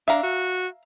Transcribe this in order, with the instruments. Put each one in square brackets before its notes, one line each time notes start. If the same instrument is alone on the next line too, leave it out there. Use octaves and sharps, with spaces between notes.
[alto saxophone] D4 [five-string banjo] E5 F5 A#5
[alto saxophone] F#4